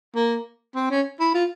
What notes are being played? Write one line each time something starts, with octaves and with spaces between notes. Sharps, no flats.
A#3
C4
C#4
E4
F4